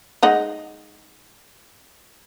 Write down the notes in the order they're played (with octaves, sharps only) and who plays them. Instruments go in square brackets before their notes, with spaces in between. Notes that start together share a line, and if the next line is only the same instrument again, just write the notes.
[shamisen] G#3 D#4 F#5